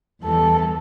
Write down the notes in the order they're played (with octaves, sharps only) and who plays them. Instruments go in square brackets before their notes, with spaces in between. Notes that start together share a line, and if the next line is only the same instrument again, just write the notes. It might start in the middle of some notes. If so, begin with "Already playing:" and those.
[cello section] E2 E3 G3 [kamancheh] A4